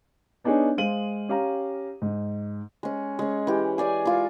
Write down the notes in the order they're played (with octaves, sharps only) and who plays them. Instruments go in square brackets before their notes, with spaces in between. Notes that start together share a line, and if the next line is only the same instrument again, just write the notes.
[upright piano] B3 D4 D#4 G#4 C#5 G#5
G#3 C5 F5 D#7 F#7
C#4 G4 F5 A#5
G#2
[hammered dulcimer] G#3 C#4
G#3 C#4
E3 G4
G#4 D5 G#5 D6
G#3 F4 D6